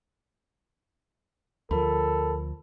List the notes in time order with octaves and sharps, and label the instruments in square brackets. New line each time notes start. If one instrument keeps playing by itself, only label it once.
[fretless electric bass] D2 F3 [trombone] A4 [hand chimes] A#4 B5